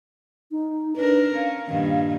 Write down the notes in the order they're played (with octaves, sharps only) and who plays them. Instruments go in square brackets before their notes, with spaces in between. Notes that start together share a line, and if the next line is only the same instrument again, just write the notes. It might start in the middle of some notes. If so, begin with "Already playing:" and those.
[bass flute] D#4
[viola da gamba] D4 A#4 [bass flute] B4
[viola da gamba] C#4 [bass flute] F5
[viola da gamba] G2 A#2 D#3